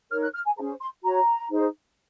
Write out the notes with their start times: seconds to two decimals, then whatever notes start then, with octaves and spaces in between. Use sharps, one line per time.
0.10 D#4 A#4 C#5 F6
0.22 F#6
0.33 F6
0.46 G#5
0.57 C#4 G#4 C5 A#5
0.80 C6
1.03 F#4 C#5 A#5
1.50 D#4 G#4 C5